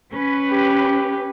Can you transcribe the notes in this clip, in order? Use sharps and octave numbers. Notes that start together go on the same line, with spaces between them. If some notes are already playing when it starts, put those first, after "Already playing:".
C#4 B4
G4